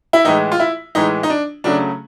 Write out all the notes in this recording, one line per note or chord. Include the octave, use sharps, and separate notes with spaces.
E4
A2 E3 G#3 D#4
F4
E4
A2 E3 G#3 D#4
D#4
D4
C#3 F#3 A3 D4